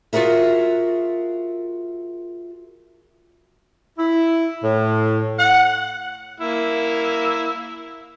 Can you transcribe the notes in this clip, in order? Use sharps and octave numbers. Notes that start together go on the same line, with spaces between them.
F4 F#4 G#4 A#4 E5
E4
A2
F#5
A#3 E4